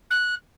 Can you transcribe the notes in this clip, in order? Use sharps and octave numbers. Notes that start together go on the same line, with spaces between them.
F#6